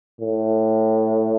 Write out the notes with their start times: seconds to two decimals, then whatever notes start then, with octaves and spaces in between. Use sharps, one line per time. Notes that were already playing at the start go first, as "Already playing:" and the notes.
0.21 A2